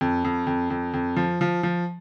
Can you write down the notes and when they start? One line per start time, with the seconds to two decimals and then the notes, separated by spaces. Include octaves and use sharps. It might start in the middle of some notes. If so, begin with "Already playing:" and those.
0.01 F2
0.25 F2
0.47 F2
0.70 F2
0.94 F2
1.16 F3
1.41 F3
1.63 F3